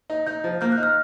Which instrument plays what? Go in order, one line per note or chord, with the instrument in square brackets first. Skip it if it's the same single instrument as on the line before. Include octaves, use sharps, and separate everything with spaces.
[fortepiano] D#4
[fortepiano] D#4 [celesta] G6
[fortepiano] F3
[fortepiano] A#3 [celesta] G6
[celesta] F#6
[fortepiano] D#4
[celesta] F6